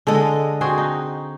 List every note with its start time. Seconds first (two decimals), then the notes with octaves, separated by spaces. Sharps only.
0.07 D3 G#3 A4 D#5
0.61 C4 F#4 G#4
0.78 D#4